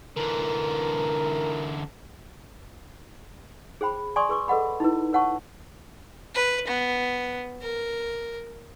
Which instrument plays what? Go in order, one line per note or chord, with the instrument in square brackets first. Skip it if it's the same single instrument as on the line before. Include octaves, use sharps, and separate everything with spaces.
[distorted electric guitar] D3 E3 [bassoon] A#4
[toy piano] G#4 C5 G5 B5
D5 G#5 C6 C#6 D#6
G#4 B4 C#6 D6
A4 B4 D#5 F#5 B5
D#4 E4 B4
B4 C#5 F#5 A5 C#6
[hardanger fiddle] B4
B3
A#4